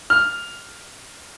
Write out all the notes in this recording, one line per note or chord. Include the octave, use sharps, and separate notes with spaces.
F6